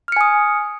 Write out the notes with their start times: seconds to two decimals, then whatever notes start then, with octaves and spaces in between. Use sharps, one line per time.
0.08 F6
0.12 C#7
0.16 G#5
0.21 D#6